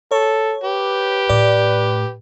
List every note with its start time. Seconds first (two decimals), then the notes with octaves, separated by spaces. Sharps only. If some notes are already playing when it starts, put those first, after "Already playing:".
0.11 A4 C#5
0.64 G4 B4
1.29 A2 D5